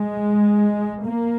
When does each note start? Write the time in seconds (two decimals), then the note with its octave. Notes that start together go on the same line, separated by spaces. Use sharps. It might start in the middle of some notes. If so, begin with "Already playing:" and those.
Already playing: G#3
1.06 A#3